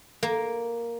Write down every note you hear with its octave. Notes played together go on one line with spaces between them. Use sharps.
A#3